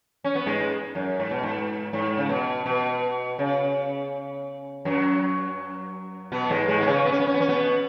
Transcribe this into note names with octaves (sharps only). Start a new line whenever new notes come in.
C#4
B3
G#2 G#3
F#2
G#2
B2
G#2
G#2
C#3
B2
B2
C#3
F#2 F#3
B2 B3
G#2 G#3
G#2 G#3
B3
C#3 C#4
B3
C#4
B3
C#4
B3
C#4
B2 B3